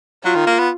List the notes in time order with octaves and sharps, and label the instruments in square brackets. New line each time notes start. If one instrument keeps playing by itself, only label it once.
[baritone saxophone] F#3 [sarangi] F4
[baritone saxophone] D#3
A#3
B3